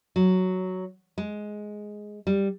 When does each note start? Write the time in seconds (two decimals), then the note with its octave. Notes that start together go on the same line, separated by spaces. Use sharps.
0.16 F#3
1.18 G#3
2.27 G3